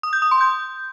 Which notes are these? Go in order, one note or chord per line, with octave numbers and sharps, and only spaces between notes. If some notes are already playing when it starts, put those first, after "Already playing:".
D#6
G6
D#6
C6
G6